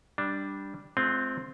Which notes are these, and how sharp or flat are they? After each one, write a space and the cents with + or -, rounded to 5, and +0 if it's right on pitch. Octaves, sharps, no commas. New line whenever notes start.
G3 +0 D4 +0
G#3 +45 C4 -5 F4 +0